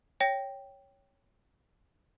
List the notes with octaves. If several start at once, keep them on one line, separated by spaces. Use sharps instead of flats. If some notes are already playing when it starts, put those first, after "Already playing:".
C#5 G5 A#6